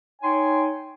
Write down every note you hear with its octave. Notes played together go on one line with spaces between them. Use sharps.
D#4 C#5 G5 G#5 C6